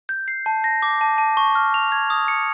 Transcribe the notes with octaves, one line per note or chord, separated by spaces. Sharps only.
G6
C7
A5
A#6
D6
A5
A5
C#6
F6
F7
G#6
D#6
C#7